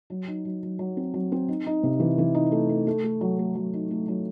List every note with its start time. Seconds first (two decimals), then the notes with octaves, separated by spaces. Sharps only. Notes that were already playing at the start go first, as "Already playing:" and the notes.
0.10 F#3
0.28 D#4
0.45 F#3
0.63 F#3
0.79 F#3
0.97 C4
1.14 F#3
1.32 C4
1.48 D#4
1.66 D#4
1.83 C3
2.00 E3
2.18 E3
2.35 D#4
2.52 A3
2.69 A3
2.87 A3
3.04 A3
3.21 F#3
3.39 A3
3.55 F#3
3.73 D#4
3.91 A3
4.08 F#3